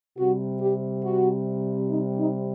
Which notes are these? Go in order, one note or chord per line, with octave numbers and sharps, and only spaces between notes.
C3 G3 F#4
G4
F#4
D#4
D#4